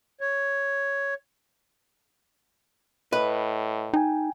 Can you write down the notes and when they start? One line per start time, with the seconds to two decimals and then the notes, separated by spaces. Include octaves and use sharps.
0.21 C#5
3.13 A2 B4 D#5
3.93 D#4 G5 G#5